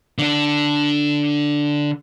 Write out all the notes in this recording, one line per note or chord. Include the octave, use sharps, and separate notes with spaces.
D3 D4